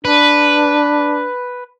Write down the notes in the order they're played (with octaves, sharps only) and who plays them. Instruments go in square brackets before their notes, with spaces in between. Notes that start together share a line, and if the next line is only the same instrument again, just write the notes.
[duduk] D4 [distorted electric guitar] B4